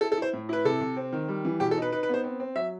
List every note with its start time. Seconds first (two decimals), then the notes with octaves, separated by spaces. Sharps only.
0.01 E4 A4
0.12 A4
0.18 E4 C5
0.33 A2
0.49 E4 B4
0.65 C3 A4
0.81 C3
0.97 C4
1.13 D#3
1.29 G3
1.45 E3
1.60 B2 G4
1.71 A4
1.77 D#4 B4
1.92 D#4 B4
2.03 B4
2.09 B3 C5
2.24 C4
2.40 C4
2.56 F#3 E5